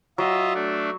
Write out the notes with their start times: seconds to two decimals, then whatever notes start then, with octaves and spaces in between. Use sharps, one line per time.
0.18 F#3 F4 D#5 E5
0.54 A3 D4